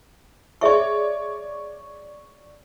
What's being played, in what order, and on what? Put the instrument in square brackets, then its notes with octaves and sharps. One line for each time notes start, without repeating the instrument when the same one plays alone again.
[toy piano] G#4 E5 C#6 [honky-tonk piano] C#5 D5